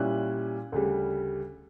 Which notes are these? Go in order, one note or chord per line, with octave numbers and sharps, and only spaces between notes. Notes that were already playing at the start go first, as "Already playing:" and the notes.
Already playing: A#2 G3 C#4 E4 F#6
D2 C#3 G3